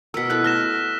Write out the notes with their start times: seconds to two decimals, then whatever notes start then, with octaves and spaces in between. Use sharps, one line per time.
0.14 B2 A#4 E6 B6
0.30 E4 A4 B5 F#6
0.44 A3 F6 A#6 E7